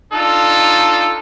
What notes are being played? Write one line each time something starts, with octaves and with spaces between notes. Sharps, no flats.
D4 D#4 F4 A4